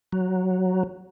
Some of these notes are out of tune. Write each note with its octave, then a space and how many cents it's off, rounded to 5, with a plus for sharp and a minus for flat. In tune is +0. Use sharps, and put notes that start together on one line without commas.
F#3 +0